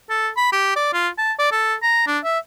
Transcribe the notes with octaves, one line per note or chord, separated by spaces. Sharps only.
A4
B5
G4
D5
F4
A5
D5
A4
A#5
D4
E5